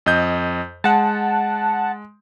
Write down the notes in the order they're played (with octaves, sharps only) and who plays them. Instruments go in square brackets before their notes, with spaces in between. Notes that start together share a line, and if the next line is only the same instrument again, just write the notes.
[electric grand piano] F2 D#5 G6
[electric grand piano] G#3 [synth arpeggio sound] F#5 A5